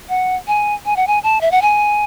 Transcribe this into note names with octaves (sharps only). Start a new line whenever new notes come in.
F#5
G#5
G#5
F#5
G#5
A5
E5
F#5
G#5